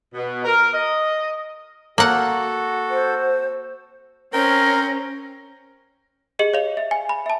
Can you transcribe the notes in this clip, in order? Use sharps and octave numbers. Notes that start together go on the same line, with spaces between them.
B2
A#4
D#5
A#3 F#4 A4 F#5
C5
C4 C#4 A#4 A#6
G4 G#4 D#5 C#7 F#7
C#5 F5 F7
E5
G#5
B5
E5 A5